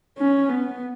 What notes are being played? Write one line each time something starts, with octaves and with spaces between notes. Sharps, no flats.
C#4
B3